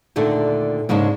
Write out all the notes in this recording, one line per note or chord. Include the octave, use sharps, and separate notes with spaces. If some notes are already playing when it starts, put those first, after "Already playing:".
D#2 A#2 D3 A3 D4
G#2 C#3 G#3 A#3 D4